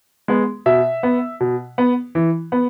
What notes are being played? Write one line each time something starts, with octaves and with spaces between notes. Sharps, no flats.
G#3 B3
B2 E5
B3
B2
B3
E3
B3